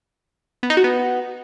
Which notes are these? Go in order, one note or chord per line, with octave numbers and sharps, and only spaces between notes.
B3
D#4
F#4
B3